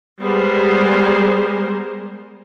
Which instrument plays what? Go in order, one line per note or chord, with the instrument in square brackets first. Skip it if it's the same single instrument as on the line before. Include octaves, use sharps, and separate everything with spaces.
[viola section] G3 G#3 B3 G#4 A#4 C5